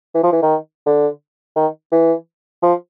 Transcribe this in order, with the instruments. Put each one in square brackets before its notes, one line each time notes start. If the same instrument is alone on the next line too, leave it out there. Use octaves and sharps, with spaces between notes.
[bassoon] E3
F3
E3
D#3
D3
D#3
E3
F3